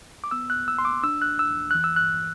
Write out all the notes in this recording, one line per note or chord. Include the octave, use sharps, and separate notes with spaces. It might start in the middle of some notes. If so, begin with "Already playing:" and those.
D6
B3 E6
F#6
C2
E6
C2 C6
D6
D4 E6
F#6
E2
E6
E2
E3 F#6
E6
G2 F#6